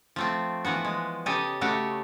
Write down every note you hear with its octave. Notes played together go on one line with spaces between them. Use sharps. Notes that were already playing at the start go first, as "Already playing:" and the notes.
F3 A3 C4
E3 F3 B3 F#4
G#3
C#3 G4 A4 D#5 G#5
C#3 A3 F#4 G4